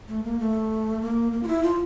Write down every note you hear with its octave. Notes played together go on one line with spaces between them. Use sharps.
A3
A#3
A3
A#3
A#3
F4
E4
F4